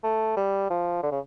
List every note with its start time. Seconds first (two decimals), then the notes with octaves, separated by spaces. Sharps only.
0.04 A3
0.36 G3
0.70 F3
1.03 D3
1.12 C#3